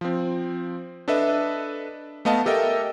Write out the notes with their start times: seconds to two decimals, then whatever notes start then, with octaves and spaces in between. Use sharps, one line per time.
0.01 F3 C4
1.08 D4 A4 B4 D#5 E5
2.25 A3 B3 D#5 F5 A5
2.46 G4 A4 A#4 D#5 E5 G5